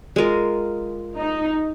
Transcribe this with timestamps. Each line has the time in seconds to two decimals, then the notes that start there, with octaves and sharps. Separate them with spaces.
0.16 G#3 F4 A#4
1.17 D#4